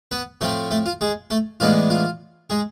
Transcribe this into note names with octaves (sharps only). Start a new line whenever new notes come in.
B3 B4
A2 F3 A3 C4 A4
A3 A4
F4
G#3 G#4
A3 A4
A2 E3 G#3 B3 D4 F4
F4
G#3 G#4